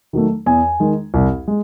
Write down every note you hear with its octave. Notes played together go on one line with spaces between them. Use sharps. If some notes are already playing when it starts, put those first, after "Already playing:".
D#3 F#3 A3
E2 G#5
D#3 G#3
C2
G#3